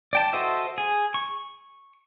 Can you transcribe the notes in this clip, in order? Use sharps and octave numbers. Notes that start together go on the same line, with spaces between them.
D5 G5 A5
F#4 A4 C5 D#5 E5
G#4
C#6